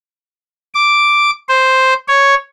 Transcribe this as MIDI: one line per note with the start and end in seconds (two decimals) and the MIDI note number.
0.75 1.30 86
1.49 1.94 72
2.08 2.35 73